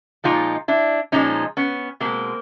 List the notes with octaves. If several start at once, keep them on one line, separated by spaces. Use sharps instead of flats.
A#2 F3 G#3 D#4 F4
D4 E4
A#2 F3 G#3 C#4 D#4
B3 C#4
B2 G#3 A#3 C4